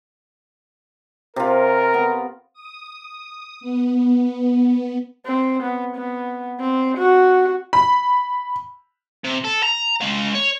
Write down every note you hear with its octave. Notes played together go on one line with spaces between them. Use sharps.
C3 F4 A#4
B3
D#6
B3
C4
B3
B3
C4
F#4
B5
C3
A4
A#5
G#3 F5
C#5